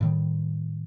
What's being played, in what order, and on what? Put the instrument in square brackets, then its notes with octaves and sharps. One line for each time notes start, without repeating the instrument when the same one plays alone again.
[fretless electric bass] A2 D#3 G3